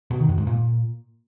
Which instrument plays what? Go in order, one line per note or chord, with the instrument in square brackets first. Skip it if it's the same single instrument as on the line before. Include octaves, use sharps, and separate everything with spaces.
[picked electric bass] B2
D#3
F#2
G#2
A#2